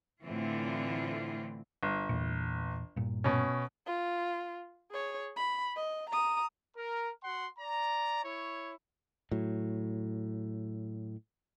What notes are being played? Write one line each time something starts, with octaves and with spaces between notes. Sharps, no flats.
A2 D3 E3 C4 F4
G1
E2 A#2
G2 A#2
B2 C#4
F4
G#4 C#5
B5
D#5
A#5 D#6
A#4
F#4 F#5 C6
D5 A#5
E4 C#5
A2 F#3